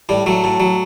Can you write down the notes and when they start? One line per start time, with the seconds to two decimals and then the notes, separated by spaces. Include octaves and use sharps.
0.09 A2 G3
0.26 F#3 A3
0.44 A2
0.60 F#3